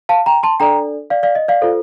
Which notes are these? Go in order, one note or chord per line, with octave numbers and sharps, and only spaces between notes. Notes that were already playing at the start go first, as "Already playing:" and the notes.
F5 A5
G5 A#5
A5 C6
D4 A4 D5 G5 A#5
D5 F5
D5 F5
D#5
D5 F5
F4 A4 C5